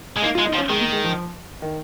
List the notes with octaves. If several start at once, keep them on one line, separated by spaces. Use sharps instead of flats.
G#3
A#3 D#4
F4
G#3
D#4
F3
C#4
D#3 G#3
A#3
G#3
F3
D#3